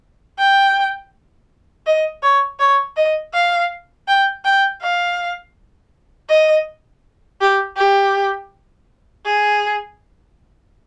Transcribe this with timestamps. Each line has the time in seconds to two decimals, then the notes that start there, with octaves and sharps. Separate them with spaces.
0.39 G5
1.86 D#5
2.23 C#5
2.59 C#5
2.97 D#5
3.34 F5
4.08 G5
4.45 G5
4.82 F5
6.29 D#5
7.41 G4
7.77 G4
9.25 G#4